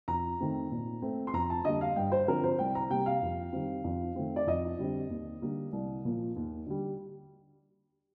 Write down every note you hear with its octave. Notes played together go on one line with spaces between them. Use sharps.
F2 A#5
D#3 A3 C4
A#2
A3 C4
C6
F2 A#5
A5
D3 G3 A#3 D#5
F5
G2 G5
C5
D3 F3 C4 A#4
C5
C2 G5
A#5
C3 G3 A#3 G5
F5
F2
D#3 G3 C4
F2
D#3 A3 C4
D5
F2 D#5
D3 G3 C4
D#2
D3 G3 A#3
C2
A#2 F3 A#3
D#2
D3 G3